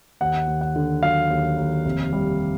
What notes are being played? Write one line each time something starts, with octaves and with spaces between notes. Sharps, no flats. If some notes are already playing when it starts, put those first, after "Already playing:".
D#2 F#5
D#2
F#5
D3
F#3 F5
D#2
D#2
F1
G3